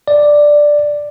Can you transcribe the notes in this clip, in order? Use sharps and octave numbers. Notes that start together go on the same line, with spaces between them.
D5